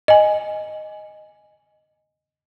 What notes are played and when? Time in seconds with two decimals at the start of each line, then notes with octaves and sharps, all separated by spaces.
0.08 D#5 G#5